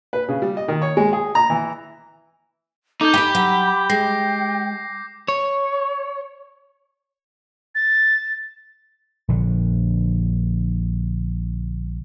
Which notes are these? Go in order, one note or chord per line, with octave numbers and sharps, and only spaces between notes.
B4
C#3
G3
D#5
D#3
C#5
G#3
G#4
A#5
E3
D#4 A4 D6 G6
G4 G#5 A5 B5
F#3
G#3 G5 A#6 C7
C#5
A6
A#1 D3